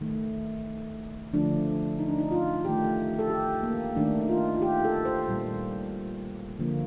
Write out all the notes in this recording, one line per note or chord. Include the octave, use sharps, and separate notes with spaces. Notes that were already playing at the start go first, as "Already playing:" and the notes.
D#3 A3
D3 F3 A3 D4
D#4
D4
D#4
F4
D#3 A3 G4
A4
G4
A#3
D#3 A3 D4
D#4
F4
F4
G4
A4
C5
A#2 G3 A#3
D3 F3 A#3